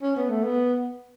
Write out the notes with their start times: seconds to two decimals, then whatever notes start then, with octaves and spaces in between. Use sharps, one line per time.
0.02 C#4
0.16 B3
0.29 A3
0.43 B3